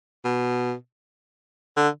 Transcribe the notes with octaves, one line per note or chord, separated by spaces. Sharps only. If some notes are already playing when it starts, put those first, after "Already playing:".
B2
D3